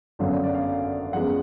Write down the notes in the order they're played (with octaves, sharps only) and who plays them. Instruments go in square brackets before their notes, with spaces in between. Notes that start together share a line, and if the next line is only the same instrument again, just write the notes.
[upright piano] G#1 F#2 D3 F#3 B3 F5
D5
D5
F5
F#2 F3 G#3 B3 F#5